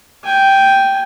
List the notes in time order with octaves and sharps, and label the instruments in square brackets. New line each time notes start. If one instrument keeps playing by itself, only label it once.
[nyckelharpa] G5 G#5